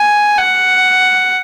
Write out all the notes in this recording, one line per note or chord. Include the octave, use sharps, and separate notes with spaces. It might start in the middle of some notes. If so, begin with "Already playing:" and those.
Already playing: G#5
F#5